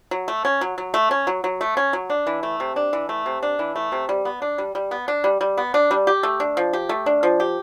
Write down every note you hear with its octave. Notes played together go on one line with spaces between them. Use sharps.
F#3
A3
C#4
F#3
F#3
A3
C#4
F#3
F#3
A3
C#4
F#3
D4
E3
A3
C3
D4
E3
A3
C3
D4
E3
A3
C3
G3
B3
D4
G3
G3
B3
D4
G3
G3
B3
D4
G3
G4
A3
D4
F3
G4
A3
D4
F3
G4